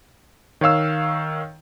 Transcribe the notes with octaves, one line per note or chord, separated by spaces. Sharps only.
D#3 C#5 F5 E6